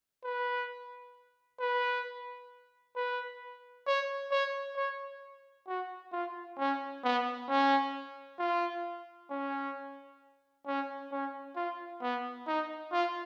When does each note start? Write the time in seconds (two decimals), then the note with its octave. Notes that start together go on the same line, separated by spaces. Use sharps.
0.24 B4
1.60 B4
2.96 B4
3.87 C#5
4.31 C#5
4.76 C#5
5.67 F#4
6.12 F4
6.59 C#4
7.04 B3
7.49 C#4
8.39 F4
9.31 C#4
10.67 C#4
11.12 C#4
11.56 F4
12.02 B3
12.47 D#4
12.92 F4